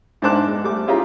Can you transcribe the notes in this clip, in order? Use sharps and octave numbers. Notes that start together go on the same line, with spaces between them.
G#2 D4 C5 A5 D6 F#6
G#3
G3 A3 D6
C#4 E4 F4 G4 G#4 A#5